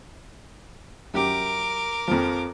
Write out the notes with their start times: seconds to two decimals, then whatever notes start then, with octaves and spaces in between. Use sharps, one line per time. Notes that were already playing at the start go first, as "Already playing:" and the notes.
1.14 F#2 G4 A#4 D6
2.08 F2 F3